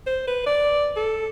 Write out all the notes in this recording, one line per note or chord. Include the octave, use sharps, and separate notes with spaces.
C5
B4
D5
A4